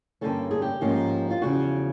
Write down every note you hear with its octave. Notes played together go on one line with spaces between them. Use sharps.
G2 D3 G3 A#3 C#4 A4
G#4
G4
G#2 F3 A#3 C#4
F4
E2 C#3 F3 F#4